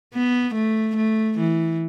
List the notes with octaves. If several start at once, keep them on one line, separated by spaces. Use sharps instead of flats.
B3
A3
A3
E3